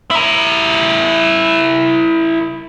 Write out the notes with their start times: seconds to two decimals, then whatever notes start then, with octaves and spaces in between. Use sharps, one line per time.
0.11 E4 A#4